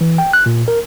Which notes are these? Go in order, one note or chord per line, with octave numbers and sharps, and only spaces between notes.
E3
G5
F#6
A#2
A#4